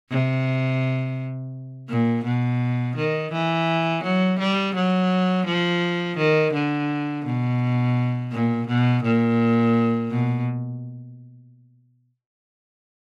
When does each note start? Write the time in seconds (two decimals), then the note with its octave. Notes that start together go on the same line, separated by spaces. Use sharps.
0.10 C3
1.89 A#2
2.24 B2
2.96 D#3
3.32 E3
4.03 F#3
4.39 G3
4.75 F#3
5.46 F3
6.17 D#3
6.53 D3
7.25 B2
8.32 A#2
8.68 B2
9.03 A#2
10.10 B2